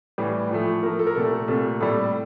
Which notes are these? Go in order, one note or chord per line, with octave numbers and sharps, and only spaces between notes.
A2 E3 G3
A2 F3 A3
A2 F3 A3 A#4
A4
A#4
C2 A#2 A3 A4
C2 A#2 A3
A2 G3 A4